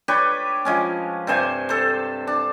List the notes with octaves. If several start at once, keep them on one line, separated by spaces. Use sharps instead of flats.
D4 G4 B4 C#5
F3 G#3 C#4
G2 C3 C5 G#5
A4 C5
D4